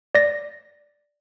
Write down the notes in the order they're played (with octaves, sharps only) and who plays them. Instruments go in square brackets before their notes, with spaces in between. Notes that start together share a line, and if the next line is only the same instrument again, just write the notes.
[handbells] D5 A#6